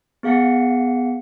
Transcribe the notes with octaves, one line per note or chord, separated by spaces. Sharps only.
B3 G#4 F5 F#5 C#7